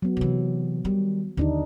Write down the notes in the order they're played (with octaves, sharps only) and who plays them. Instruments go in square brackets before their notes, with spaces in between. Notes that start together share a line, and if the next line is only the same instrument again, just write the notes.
[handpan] F#3 B3
[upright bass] C3 E3
D#3 G3
[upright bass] D#2 [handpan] D3 D4 D#4